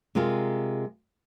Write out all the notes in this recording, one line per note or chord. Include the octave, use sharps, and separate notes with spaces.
C3 G#3 F4 A#4